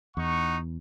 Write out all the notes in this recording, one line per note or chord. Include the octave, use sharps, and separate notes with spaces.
E2 D#4 F#5 C#6